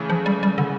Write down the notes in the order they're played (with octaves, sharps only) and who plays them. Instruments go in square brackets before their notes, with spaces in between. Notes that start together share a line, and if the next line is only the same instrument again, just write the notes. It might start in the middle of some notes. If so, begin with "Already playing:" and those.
Already playing: [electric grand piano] C#3 E3 A3
[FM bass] F3
G3
G3
D3